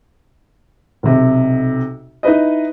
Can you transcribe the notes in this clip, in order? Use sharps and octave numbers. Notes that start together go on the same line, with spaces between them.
B1 C3
D#4 E4 B4 D#5